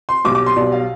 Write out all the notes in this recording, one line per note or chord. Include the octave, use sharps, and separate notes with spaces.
C6
B1 B2 G3 D6
D6
C6
B1 B2 G3 D5
F5